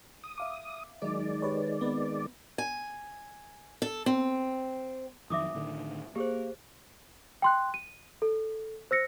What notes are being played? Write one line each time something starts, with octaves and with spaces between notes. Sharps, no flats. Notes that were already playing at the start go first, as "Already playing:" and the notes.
D#6
E5 F5 D6
D#3 F#3 G#3 D#4 D5
G4 B4 C#5
B3 C4 B4
G#5
A4
C4
F2 D#3 F#3 E5 D6 D#6
A2 D3 D#3
A#3 G4 G#4 C5
G5 C6 F#6
D#7
A4
C5 E6 A#6 C#7